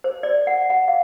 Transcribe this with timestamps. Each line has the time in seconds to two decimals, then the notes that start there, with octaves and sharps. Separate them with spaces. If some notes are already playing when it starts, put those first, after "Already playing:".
0.04 C5
0.23 D5
0.47 F#5
0.70 F#5
0.88 F5